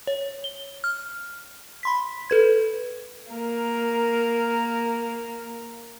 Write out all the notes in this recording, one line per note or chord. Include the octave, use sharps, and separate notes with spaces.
C#5
G7
F6
B5 C6 B6
A4 B4 G#6
A#3 A#4